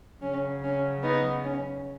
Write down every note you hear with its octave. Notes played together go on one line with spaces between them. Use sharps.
C#3 F#3 C#4
C#4
B3 D#4
C#4